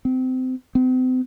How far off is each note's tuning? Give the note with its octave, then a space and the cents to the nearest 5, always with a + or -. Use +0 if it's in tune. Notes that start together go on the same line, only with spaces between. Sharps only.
C4 -25
C4 -40